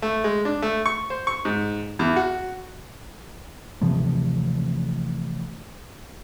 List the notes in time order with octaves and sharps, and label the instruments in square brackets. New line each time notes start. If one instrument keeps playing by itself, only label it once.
[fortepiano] A3
G#3
D4
A3
C#6
C5
C#6
G#2
E2
F#4
[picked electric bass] C3 E3 F3 A3